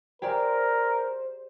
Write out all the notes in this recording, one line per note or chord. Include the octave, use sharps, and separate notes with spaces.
G4 G#4 A#4 C5 D5